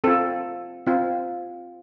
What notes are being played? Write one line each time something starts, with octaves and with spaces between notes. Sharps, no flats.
C4 F4 A4
C4 F4